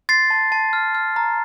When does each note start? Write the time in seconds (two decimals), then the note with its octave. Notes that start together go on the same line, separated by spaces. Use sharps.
0.09 C6 A6 C7
0.30 A5
0.52 A5
0.73 F6
0.95 F6
1.16 A#5